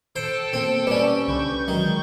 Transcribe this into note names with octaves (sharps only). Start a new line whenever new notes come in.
A4 C5 G5 A5
B2 A#3 C4
G3 C#4 B4 D5
C2 D3 B4 C#6 G6
D#3 F#3 G#3